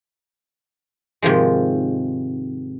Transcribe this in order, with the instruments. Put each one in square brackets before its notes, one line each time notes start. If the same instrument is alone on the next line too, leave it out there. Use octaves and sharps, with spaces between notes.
[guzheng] G#2 C3 D#3 F3 G#3